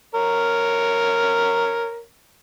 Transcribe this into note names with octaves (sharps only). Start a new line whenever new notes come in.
A#4 C#5